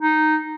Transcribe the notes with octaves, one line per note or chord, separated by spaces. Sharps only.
D#4